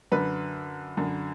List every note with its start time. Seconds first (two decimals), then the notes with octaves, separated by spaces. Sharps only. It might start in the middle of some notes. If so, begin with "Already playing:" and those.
0.12 F#2 D3 B4
0.97 F#2 D3